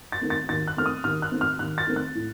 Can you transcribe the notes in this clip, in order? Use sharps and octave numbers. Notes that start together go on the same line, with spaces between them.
A6
D#3 A3 C4
A6
D#2 A6
F#6
D#3 A3 C4 F6
D#6
D#2 F6
F#6
D#3 A3 C4
F6
D#2 F#6
A6
D#3 A3 C4
F#6
A2